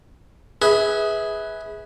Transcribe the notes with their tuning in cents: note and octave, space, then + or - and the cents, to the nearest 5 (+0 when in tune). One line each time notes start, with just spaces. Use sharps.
G#4 +0 B4 +0 E5 -30